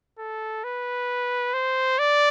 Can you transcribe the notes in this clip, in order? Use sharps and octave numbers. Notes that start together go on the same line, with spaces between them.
A4
B4
C5
D5